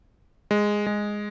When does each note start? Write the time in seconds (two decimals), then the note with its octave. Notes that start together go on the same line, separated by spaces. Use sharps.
0.51 G#3
0.87 G#3